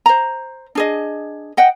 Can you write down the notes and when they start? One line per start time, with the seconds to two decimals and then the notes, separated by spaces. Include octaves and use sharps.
0.06 C5 A#5
0.75 D4 G#4 D#5
1.57 D#5 F#5 G5